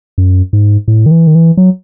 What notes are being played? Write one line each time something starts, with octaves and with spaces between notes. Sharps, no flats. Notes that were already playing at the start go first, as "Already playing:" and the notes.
F#2
G#2
A2
D#3
E3
D#3
E3
F#3